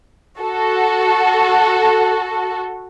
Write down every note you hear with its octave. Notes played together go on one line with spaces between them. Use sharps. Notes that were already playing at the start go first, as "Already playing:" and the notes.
F#4 A4